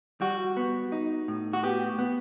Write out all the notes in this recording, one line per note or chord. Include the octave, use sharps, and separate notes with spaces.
G3 F#4
B3
D#4
A2
F#4
B3 G4
B3